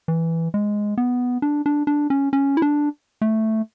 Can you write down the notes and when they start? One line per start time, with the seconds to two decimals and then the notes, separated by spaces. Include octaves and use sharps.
0.08 E3
0.54 G#3
0.98 B3
1.42 D4
1.66 D4
1.87 D4
2.10 C#4
2.33 C#4
2.57 E4
2.62 D4
3.22 A3